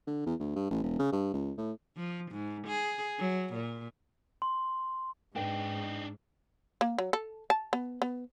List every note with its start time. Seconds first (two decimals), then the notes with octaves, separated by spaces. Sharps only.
0.07 D3
0.26 E2
0.40 D2
0.56 G2
0.70 A1
0.83 E1
0.99 C#3
1.12 G2
1.34 C#2
1.58 A2
1.97 F3
2.31 G#2
2.67 G#4
3.19 F#3
3.53 A#2
4.42 C6
5.36 G#2 D4 D#4 B4 G5
6.81 A#3
6.99 F#3
7.13 A4
7.50 A5
7.73 B3
8.02 B3